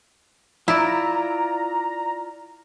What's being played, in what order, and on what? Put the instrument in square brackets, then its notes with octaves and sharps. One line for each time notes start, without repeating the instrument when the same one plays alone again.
[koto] E4 [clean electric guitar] F4 D5 [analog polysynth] A#5